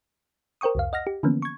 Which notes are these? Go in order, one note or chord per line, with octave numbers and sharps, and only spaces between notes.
A#4 C5 G5 C#6 D#6
C2 F2 F5
D#5 F#5 F6 A#6
G4
D3 E3 F3 A#3 B3 C#4
C#6 G#6